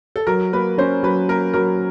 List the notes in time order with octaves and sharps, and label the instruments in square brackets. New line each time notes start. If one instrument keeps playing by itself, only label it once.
[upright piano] A4
[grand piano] F#3 [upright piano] A#4
[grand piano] A#3 [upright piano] B4
[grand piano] C#4 [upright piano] C5
[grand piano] F#3 [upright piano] B4
[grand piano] A#3 [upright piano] A#4
[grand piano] F#3 [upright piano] A#4